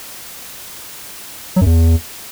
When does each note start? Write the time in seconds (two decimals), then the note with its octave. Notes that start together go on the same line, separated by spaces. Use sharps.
1.56 F#3
1.61 F#2
1.66 E2